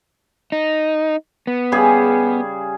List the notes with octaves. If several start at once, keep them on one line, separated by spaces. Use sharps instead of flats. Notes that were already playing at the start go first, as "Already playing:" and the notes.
D#4
B3
C#3 G3 G#4